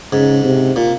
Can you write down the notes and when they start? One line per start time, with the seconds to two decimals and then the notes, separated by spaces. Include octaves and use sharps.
0.13 G#2 C#3
0.45 C3
0.76 A#2